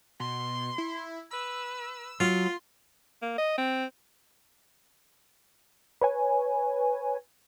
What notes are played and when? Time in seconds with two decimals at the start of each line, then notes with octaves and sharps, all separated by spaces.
0.20 B2 C6
0.78 E4
1.31 B4 E6
2.20 F#3 F4 C6
3.22 A#3
3.38 D#5
3.58 C4
6.01 B4 C#5 G#5